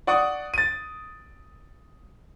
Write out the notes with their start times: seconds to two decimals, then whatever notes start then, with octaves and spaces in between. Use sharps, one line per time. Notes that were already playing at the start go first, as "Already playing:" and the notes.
0.07 D5 F#5 C#6 D#6
0.54 A6 D#7